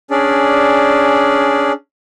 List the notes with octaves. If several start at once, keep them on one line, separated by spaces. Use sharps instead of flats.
C#4 D4 G#4 D5